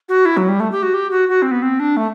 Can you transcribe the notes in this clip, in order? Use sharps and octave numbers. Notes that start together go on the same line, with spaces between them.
F#4
E4
F#3
G3
A3
G4
F#4
G4
F#4
F#4
C4
B3
C4
D4
A3